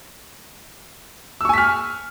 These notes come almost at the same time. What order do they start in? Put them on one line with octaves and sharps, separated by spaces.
E6 C#6 G#5 B6 F6